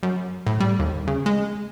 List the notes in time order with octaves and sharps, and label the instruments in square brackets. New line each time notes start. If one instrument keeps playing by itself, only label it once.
[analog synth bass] F#2
A2
G3
D#2
C#3
G#3